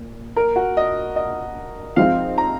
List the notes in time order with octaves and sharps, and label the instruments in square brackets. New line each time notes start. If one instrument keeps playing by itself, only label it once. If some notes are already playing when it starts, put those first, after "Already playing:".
Already playing: [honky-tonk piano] A#2
[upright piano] A#4
F#4
D#5
D#5
[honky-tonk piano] F3 G#3 C4 D#4 [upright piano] F5
[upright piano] A#5